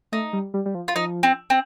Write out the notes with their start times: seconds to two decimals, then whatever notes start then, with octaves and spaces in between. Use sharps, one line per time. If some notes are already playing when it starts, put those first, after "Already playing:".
0.12 A3 D#4
0.33 G3
0.54 G3
0.66 G3
0.75 F3
0.88 F4
0.95 F3 D#4
1.23 C4
1.50 C4